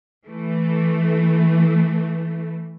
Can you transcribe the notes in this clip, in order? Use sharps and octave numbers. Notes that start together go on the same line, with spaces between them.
E3 A3